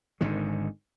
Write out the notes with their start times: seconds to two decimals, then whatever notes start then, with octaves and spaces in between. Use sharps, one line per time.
0.21 G#1 G#2 D3 D#3